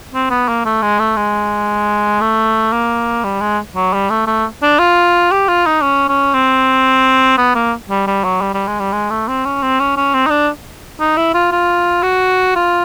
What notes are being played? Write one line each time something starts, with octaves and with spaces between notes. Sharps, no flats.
C4
B3
A#3
A3
G#3
A3
G#3
A3
A#3
G3
G#3
F#3
G3
A3
A3
D4
F4
G4
F4
D#4
C#4
C#4
C4
B3
A#3
G3
G3
F#3
G3
G3
G#3
G3
G#3
A3
C4
C#4
C4
C#4
C#4
C4
D#4
D4
D#4
E4
F4
F4
F#4
F4